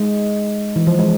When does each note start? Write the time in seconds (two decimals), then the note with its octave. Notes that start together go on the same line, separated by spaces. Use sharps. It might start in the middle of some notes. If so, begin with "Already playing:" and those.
Already playing: G#3
0.76 E3
0.87 F3
0.99 G#3